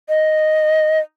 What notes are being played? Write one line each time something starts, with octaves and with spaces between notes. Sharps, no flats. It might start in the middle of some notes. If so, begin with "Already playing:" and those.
D#5